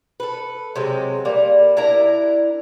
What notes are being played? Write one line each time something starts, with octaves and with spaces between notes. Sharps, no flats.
A4 B4
C3 F#3 G#3 A4
G3 A#3 A#4
D4 E4 A#4 A#5